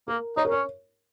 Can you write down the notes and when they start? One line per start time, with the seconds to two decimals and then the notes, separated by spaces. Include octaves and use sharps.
0.08 A#3 A#4
0.37 D#4 C#5
0.45 A#4
0.51 C#4 C#5